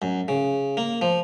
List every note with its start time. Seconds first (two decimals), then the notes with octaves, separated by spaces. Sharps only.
0.02 F#2
0.28 C#3
0.77 A#3
1.02 F3